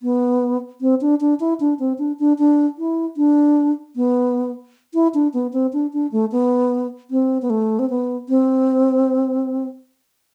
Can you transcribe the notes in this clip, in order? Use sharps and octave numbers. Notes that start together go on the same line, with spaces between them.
B3
C4
D4
D4
E4
D4
C4
D4
D4
D4
E4
D4
B3
E4
D4
B3
C4
D4
D4
A3
B3
C4
B3
A3
C4
B3
C4